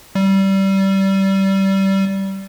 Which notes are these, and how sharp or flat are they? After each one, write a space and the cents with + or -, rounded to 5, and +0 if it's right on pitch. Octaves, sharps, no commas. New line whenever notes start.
G3 -20